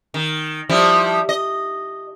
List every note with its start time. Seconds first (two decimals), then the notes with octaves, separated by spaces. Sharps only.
0.14 D#3
0.69 F3 G3 E4
1.29 D#5